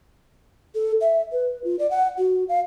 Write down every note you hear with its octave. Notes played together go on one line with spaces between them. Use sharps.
A4
E5
B4
F4
D5
F#5
F#4
F5